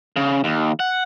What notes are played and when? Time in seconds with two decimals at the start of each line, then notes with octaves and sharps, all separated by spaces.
0.16 C#3
0.44 D#2
0.80 F#5